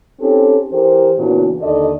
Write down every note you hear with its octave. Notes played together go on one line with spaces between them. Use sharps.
C4 C#4 D#4 G4 A4
E3 G4 A#4 C5
A#2 C#3 E3 B3 D4 F#4
D#2 D3 D#4 A4 D5 D#5